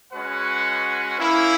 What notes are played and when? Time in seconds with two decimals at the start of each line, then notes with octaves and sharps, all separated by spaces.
0.11 G#3 C#4 F#4 B4 F#5
1.18 A#3 C#4 E4